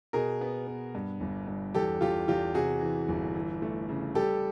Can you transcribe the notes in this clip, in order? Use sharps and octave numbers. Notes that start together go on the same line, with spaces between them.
B2 G#4 A#4
B3
B3
G2
G1
G2
E2 G4 A4
E2 F4 G4
E2 F4 G4
C3 F#4 G#4
E3
G1
E3
A3
C#3
G3 G4 A4